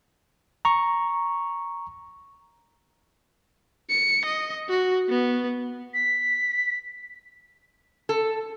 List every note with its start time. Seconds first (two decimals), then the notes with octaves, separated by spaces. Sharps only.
0.65 A#5 C#6
3.90 C#7
4.25 D#5
4.69 F#4
5.09 B3
5.94 B6
8.09 A4